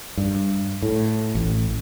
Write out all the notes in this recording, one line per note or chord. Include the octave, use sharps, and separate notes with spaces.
G2
A2
A1